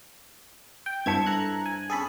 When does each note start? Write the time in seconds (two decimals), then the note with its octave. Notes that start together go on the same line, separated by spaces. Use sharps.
0.86 G5
1.06 G2 E4 C5 A5 G#6 B6 C#7
1.26 A4 A#5 F#6
1.66 G#5
1.90 C#4 G#4 A4 G#5 B5